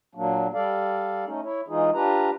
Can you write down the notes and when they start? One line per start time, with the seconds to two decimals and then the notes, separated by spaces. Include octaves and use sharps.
0.15 A#2 F#3 A#3 D4
0.54 G3 A4 D5 F5
1.25 A3 C#4 D#4
1.43 E4 C#5
1.68 E3 G#3 D#4 F4 G#4
1.94 D4 F4 G4 B4 A#5